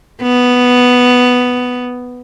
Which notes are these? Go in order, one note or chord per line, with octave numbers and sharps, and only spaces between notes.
B3